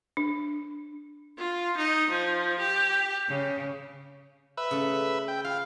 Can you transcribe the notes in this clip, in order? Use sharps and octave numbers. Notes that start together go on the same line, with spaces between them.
D4
F4
D#4
F3
G4
C#3
B4 E5
C#3 A3
G5
F4 F5